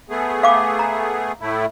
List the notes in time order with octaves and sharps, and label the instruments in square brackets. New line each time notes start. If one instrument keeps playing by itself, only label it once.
[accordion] A3 B3 G#4
[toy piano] F5 D6
A#5
[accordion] A2 A3 E4